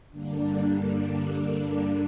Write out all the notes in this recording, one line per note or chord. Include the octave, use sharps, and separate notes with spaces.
G2 D3 G3 A#3 D4